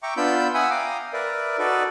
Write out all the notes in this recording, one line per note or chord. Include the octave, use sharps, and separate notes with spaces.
E5 G5 A#5 C#6 D6
B3 D4 F4 B5 E6 G6
E5 F#5 G#5 B5 D#6 E6
F5 G5 A#5 D6 D#6
A#4 B4 D5 E5
D#4 F#4 A4 B4 D5